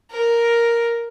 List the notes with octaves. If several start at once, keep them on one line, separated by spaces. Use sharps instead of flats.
A#4